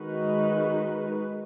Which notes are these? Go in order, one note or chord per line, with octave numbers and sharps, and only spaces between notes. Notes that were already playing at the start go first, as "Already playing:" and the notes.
Already playing: D#3 G#3 D#4 F#4 B4